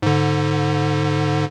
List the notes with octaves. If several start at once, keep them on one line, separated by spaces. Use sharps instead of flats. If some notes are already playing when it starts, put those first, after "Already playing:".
G#2 D3